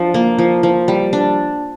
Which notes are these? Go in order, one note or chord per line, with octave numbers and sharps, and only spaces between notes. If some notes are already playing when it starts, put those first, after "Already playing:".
Already playing: F3 D4
A#3
F3
F3
G3
D4